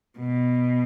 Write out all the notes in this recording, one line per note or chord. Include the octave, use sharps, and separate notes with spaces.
B2